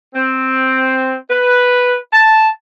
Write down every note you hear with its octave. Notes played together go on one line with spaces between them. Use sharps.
C4
B4
A5